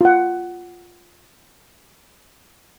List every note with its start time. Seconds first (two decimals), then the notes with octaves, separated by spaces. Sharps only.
0.01 F4 F#5